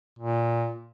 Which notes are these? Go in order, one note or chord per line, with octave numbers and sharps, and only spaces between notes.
A#2